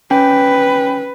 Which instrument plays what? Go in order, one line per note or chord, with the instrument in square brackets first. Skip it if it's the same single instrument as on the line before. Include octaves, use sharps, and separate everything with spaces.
[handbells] C#4 G5 [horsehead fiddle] B4